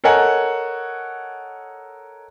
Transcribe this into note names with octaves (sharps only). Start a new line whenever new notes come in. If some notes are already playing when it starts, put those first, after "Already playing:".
A4 A#4 C#5 D#5 F#5 G#5